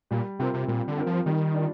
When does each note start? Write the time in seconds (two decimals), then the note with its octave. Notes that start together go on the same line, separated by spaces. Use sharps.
0.11 A#2 G3
0.39 C3 C4 F4 A#4
0.54 C3
0.68 A#2 G3
0.88 D3
0.97 C4 F4 A#4
1.07 F3
1.26 D#3 G3
1.54 D4 F4